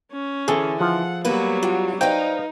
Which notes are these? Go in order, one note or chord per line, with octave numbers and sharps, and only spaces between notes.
C#4
D3 E3 G#4 A4
F3 F4 F#5
F#3 G3 A#3 B3 B4
D4 F4 F#4
D#4 B4 C5 D5 D#5 F5 G5